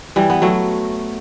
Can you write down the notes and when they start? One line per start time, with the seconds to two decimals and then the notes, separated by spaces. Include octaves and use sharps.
0.16 E3 G3
0.30 B3
0.42 F#3 A3